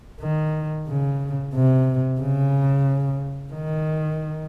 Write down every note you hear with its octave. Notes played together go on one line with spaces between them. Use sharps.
D#3
C#3
C3
C#3
D#3